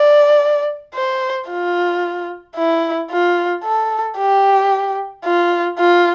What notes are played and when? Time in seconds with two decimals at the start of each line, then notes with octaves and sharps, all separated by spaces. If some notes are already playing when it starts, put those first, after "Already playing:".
Already playing: D5
0.94 C5
1.49 F4
2.56 E4
3.11 F4
3.64 A4
4.18 G4
5.25 F4
5.79 F4